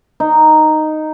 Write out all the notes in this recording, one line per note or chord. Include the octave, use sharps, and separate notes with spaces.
D#4